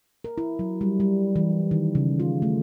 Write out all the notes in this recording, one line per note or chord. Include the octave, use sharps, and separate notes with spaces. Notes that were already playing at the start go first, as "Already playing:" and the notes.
A#4
E4
F#3
G3
G3
E3
D#3
C#3
F4
A3